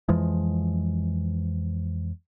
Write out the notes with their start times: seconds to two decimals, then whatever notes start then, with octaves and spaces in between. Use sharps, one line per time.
0.09 F2 E3 F3 G#3